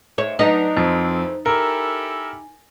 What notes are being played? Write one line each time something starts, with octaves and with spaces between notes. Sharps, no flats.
G#2 C#5 E5
F#3 D4 D#4 B4 D#5
F2 E3 A3 C4 C5
E4 G4 A4 A#4 G#5